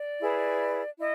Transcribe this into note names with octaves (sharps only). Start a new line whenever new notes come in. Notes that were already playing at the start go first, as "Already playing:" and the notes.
Already playing: D5
E4 G#4 B4
E4 D#5